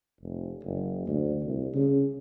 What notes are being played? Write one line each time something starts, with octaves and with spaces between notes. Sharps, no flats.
F1
F#1
D2
C2
C#3